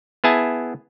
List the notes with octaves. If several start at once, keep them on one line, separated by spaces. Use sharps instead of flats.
B3 E4 G#4 E5 G#5 A5